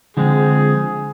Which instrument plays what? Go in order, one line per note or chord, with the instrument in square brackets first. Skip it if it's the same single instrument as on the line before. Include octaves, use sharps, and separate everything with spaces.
[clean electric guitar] D3 F3 G#3 C4 [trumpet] G#4